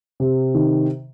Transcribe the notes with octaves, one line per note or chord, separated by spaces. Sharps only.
C3
D#3